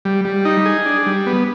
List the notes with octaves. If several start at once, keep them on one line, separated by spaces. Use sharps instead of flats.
G3
G3
D#4
G#4
D4
G3
B3